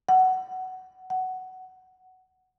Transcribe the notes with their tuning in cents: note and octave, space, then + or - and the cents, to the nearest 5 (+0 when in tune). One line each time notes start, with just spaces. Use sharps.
F#5 +15
F#5 +10